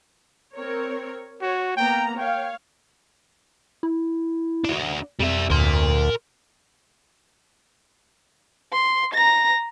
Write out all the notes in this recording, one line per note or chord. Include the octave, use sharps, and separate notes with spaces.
C4 A#4 C#5
F#4 C#5
A#3 B3 G5 A#5
C#5 F5 G5
E4
D4 F#4
F2 G3 E5
D2 A#4 C6
C6
A#5 A#6